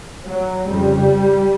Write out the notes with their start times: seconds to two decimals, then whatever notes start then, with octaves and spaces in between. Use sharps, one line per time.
0.25 F#3
0.66 F2 C#3 G3